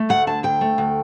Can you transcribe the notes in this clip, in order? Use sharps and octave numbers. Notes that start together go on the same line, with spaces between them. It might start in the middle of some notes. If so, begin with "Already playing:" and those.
Already playing: A3
D2 F#5
D3 A5
D2 G5
A3
D2